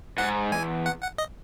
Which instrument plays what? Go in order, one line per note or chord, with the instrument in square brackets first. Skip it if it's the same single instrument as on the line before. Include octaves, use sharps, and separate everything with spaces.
[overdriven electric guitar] G#2 [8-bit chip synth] F#5
[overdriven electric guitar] E2 [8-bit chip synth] G#5
[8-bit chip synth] F#5
F#5
D#5